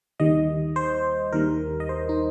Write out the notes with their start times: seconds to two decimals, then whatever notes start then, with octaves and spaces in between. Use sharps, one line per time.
0.20 D#2 D#3 G3 D#5
0.76 C5
1.32 D#2 D#3 G3 A#4
1.80 D#5
1.89 C5
2.09 D#4